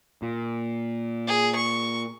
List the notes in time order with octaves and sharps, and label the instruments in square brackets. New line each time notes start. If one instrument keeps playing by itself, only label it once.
[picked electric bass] A#2
[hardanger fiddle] G#4
C#6